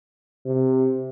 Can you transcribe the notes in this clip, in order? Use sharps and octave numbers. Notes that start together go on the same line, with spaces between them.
C3